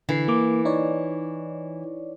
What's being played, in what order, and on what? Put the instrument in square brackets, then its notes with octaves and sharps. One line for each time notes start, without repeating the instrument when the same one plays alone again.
[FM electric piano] D3 C7 [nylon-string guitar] E3
[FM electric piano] A#3 D6
D#4 C#5 D5